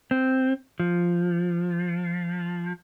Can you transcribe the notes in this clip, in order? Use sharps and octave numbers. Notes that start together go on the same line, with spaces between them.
C4
F3